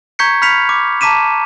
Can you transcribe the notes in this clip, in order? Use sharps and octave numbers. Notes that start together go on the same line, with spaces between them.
A#5 C#6 G6 G#6 B6 C#7
B5 F6 G6 B6 C#7 F7
D6
A5 A#5 D6 B6 D#7 E7